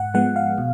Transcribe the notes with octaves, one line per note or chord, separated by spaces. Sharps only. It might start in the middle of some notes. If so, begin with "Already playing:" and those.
Already playing: G#2 F#5
F3 G#3 B3 F#5
F5
B2